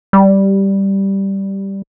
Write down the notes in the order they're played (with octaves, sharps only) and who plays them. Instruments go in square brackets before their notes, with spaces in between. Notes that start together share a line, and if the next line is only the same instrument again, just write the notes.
[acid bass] G3